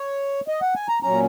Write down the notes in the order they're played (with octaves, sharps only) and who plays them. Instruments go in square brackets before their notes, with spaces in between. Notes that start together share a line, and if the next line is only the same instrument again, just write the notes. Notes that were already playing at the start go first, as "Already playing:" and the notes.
Already playing: [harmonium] C#5
D#5
F#5
G#5
A#5
A#2 F#3 C#4 A#5